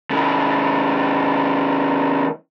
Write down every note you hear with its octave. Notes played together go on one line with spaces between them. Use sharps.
C#3 E3